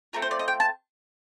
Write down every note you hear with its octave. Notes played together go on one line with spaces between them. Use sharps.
A3 C4 F4 A#4
C5
D5
D#5
G5
A5